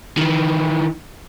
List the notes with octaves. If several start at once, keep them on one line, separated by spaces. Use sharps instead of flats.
D#3 E3